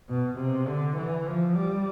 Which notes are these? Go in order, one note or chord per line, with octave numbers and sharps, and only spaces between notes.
B2
C3
D3
E3
F3
G3